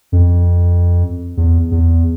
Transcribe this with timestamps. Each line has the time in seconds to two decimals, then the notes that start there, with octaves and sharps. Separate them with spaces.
0.12 F2
1.37 E2
1.71 E2